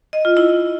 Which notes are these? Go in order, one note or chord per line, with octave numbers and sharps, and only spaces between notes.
D#5
F4
E4